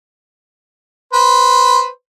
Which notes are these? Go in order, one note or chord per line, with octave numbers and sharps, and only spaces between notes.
B4 C5